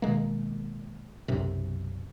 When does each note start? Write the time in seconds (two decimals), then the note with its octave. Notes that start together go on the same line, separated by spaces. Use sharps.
0.02 B2 D#3 G#3 A#3
1.28 B1 F#2 C3